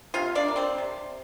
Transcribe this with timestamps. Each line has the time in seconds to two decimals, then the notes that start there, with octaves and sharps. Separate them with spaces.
0.14 C3 F4 F5
0.35 D4 D5
0.46 A#3 D4
0.56 C4 C5
0.78 C3